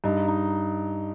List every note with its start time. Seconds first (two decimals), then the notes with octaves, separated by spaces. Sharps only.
0.04 G2 D#4
0.28 D#4